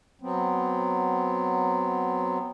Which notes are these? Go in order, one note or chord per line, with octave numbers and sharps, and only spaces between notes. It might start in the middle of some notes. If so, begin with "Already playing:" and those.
F#3 B3 C4